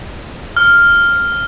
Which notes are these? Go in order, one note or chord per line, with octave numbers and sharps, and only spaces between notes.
F6